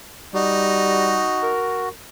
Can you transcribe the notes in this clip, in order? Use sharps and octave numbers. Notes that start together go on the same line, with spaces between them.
G3 D#4 F#4
A#4